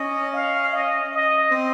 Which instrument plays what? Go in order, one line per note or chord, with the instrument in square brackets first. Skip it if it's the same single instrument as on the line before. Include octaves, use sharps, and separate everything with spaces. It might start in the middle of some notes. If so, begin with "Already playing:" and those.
Already playing: [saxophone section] C#4 [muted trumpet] D#5
[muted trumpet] F5
D#5
D#5
[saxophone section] C4